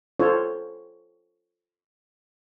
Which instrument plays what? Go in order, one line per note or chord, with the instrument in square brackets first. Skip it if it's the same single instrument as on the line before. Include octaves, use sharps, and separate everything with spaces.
[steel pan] F4 A4 C5 C#5